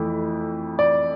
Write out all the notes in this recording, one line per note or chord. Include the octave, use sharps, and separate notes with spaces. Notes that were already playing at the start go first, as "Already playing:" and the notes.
Already playing: F2 E3 A3
D5